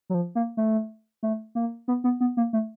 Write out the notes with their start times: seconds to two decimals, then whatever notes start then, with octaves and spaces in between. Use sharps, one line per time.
0.10 F#3
0.14 F3
0.35 A#3
0.57 A3
1.23 A3
1.55 A#3
1.88 B3
2.04 B3
2.21 B3
2.37 A#3
2.53 A3